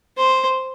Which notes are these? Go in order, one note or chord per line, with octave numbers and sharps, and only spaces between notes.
C5